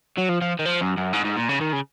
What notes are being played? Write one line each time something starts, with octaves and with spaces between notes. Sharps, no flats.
F#3
F3
F3
D#3
F3
F#2
F#2
G#2
G#2
A#2
C#3
D#3
C#3